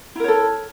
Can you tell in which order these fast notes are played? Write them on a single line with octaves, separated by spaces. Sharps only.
E4 A#4 C#5 A4